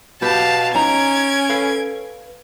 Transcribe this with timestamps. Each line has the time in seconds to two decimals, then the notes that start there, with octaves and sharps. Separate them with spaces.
0.22 B2 G4 B4 F5 A5
0.74 C#4 D#4 A#5 G#6 D7
1.49 A4 B4 F5